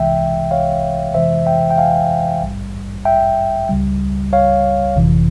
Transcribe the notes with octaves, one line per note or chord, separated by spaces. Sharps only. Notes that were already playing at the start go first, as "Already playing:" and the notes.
Already playing: C2 C3 E3 G#3 E5 G5
C#5 F5
F2 C3 E3 G#3 C5 E5
E5 G5
G5
F5 G#5
A#1 G#2 G3
E5 G5
C#2 C#3 G3
C#5 F5
G1 F2 C3 E3